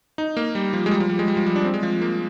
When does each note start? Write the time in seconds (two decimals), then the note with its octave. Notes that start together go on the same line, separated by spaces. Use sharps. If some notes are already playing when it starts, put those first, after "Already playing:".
0.18 D#4
0.37 A#3
0.55 G3
0.73 F3
0.86 G#3
0.91 G3
1.00 F3
1.09 G3
1.19 G#3
1.28 G3
1.37 F3
1.46 G3
1.56 D4
1.64 C4
1.74 G#3
1.83 F3
2.02 A#3